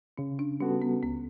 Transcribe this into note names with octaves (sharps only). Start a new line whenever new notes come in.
C#3 C#4
D4
G3 B3 C#4 F#4 A4
B3
C#2 B3